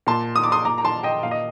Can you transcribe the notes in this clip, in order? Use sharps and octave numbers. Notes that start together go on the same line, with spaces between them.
A#2 A5 C6
D#6
D6
C6 D#6
A#2 A#5 D6
A#5
A5 C6
D#5 G5
A#2 F5
D#5